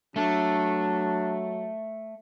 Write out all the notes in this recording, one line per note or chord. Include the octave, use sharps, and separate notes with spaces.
F#3 A3 D4